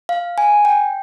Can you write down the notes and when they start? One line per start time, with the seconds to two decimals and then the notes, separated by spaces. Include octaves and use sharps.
0.09 F5
0.38 G#5
0.65 G5